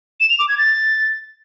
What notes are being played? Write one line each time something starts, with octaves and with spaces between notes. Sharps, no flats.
E7
F7
D6
G#6
A6